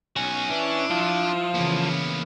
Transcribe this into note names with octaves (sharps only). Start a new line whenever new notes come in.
B1 C#4 F#4 G#5
E3 D4 E4
F3 F4
C#3 E3 A#3 B3